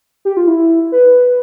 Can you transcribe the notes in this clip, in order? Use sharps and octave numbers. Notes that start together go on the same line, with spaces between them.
G4
F4
E4
B4